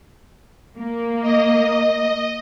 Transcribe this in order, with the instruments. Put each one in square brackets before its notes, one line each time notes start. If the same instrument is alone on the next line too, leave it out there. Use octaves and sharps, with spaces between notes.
[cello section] A#3
[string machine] D#5